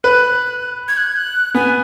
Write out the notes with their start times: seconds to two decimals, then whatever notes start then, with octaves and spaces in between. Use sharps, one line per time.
0.04 B4 F#6
0.88 G#6
0.97 F#6
1.06 G#6
1.16 F#6
1.55 B3 G#5